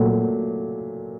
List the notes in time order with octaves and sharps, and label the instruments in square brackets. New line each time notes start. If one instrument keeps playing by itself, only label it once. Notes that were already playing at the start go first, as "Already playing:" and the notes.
Already playing: [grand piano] A#2 F#3 A3